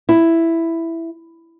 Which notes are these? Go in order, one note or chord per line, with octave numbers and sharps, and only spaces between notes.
E4